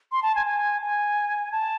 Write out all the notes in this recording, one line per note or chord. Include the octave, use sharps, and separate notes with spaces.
C6
A5
G#5
G#5
G#5
A5